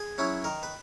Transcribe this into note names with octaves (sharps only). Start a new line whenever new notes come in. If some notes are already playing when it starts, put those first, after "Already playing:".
Already playing: G#4
F#3 C#4 E4
D#3 A#4
B4